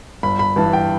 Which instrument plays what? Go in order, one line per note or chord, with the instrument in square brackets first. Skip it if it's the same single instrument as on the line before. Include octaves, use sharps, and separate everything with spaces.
[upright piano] G1 B5
B5
G2 E3 A5
G5